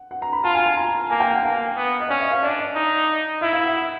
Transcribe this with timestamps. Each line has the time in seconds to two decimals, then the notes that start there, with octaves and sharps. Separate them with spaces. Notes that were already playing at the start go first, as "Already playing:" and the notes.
Already playing: F#5
0.11 F#5
0.22 A#5
0.33 B5
0.44 F4 A5
0.55 G#5
0.66 G#5
0.77 A#5
1.10 A#3 G#5
1.20 G5
1.31 F#5
1.43 A#3 F5
1.76 B3
2.00 D#5
2.09 C#4 D5
2.20 E5
2.31 F5
2.43 D4 D5
2.59 D#5
2.75 D#4
3.41 E4 E5
3.53 F5
3.63 F#5
3.74 F#5